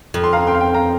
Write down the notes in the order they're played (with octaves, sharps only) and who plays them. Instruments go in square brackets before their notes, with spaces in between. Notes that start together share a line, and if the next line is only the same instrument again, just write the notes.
[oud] F2
[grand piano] C6
F5 A#5
G5 C6
F5
G5
F5 A#5